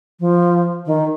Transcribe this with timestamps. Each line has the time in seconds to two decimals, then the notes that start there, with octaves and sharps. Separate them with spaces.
0.20 F3
0.86 D#3